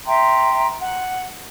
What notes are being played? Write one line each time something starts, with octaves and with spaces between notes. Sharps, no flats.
E5 G5 A#5 C6
F#5